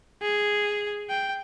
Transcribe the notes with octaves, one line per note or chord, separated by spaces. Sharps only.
G#4
G5